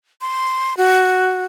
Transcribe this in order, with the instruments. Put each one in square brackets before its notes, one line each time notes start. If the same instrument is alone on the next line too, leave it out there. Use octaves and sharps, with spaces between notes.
[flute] C6
F#4